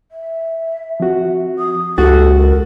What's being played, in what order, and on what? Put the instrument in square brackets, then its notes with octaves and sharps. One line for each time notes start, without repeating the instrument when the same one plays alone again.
[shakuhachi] E5
[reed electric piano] F3 C4 F#4
[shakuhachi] D#6
[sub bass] C#2 [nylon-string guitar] F#4 [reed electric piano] G4 A6 [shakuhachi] A4
[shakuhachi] A#4